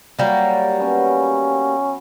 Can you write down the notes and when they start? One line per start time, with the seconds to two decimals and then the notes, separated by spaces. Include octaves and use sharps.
0.19 F#3 G3 A#3 F#4 C#5
0.80 B3 C#4 G#5